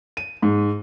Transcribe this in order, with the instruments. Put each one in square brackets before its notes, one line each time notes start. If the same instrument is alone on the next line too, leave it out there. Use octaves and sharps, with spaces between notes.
[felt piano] D#7
G#2